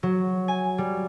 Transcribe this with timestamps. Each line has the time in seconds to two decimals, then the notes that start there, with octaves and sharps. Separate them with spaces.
0.03 F#3
0.48 G#5
0.78 G3